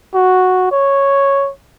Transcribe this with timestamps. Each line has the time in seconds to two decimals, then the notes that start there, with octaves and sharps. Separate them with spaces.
0.14 F#4
0.71 C#5